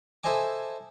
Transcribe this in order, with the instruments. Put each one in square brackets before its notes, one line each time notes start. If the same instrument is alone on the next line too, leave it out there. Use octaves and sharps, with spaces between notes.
[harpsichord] E4 A4 C5 D#5 G#5 D6